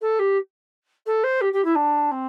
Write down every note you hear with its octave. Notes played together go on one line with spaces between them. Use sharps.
A4
G4
A4
C5
G4
G4
E4
D4
C4